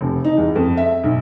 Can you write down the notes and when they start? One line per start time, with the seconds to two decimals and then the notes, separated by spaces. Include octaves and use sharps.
0.01 F1
0.24 D#4
0.38 E2
0.55 F2
0.77 E5
1.03 B1